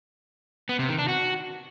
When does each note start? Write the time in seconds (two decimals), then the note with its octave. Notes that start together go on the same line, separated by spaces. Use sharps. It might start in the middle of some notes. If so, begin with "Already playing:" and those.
0.69 B3
0.79 C3
0.89 D#3
0.99 D4
1.08 F#4